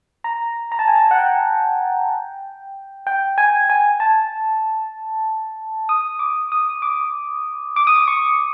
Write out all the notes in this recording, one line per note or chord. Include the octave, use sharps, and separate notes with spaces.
A#5
A#5
A5
G#5
A5
F#5
G5
G5
G#5
G#5
A5
D#6
D6
D#6
D6
D6
D#6
D6
C#6